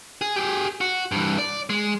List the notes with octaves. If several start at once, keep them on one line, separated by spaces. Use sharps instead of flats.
G#4
G4 G#4
F#4
G2 E3
D5
G#3